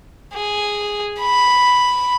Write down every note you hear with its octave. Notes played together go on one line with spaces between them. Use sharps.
G#4
B5